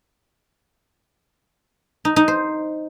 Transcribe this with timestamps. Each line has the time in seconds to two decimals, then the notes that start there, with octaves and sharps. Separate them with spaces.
2.05 D#4
2.16 D#4
2.28 C5